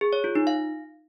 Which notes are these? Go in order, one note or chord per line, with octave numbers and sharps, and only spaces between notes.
G#4
C#5
F4
D#4
F5